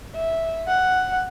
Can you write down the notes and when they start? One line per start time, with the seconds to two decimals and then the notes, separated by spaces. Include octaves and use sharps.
0.15 E5
0.67 F#5